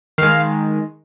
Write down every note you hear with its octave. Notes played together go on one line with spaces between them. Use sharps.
D#3 G#3 F5